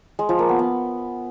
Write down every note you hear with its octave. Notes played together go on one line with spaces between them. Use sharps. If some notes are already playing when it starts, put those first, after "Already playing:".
G#3
F3
A#3
B3
B3